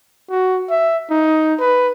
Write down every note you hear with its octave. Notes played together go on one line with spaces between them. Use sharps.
F#4
E5
D#4
B4